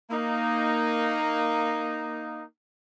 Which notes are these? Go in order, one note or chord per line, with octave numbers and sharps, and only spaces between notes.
A#3 D#4